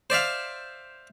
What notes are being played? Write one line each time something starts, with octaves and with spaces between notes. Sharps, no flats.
C5 D5 E5 F5